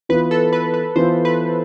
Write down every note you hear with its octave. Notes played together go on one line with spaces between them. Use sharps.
E3 B3 F4 B4
A4
B4
B4
E3 B3 F4 C5
B4